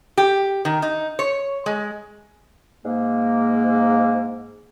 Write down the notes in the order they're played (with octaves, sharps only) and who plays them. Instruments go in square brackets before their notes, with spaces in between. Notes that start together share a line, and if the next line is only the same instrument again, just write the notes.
[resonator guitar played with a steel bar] G4
D#3
D#4
C#5
G#3
[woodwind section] G#2 A#3